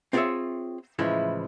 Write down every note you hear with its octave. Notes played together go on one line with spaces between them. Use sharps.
C4 F4 G#4 B4 C#5 E5
A2 C#3 E3 F3 G#3 E4